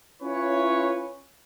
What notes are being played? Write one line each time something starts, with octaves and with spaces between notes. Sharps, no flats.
C#4 E4 F4 B4 C#5